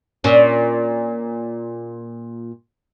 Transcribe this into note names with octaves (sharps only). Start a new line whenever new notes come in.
A#2 C#4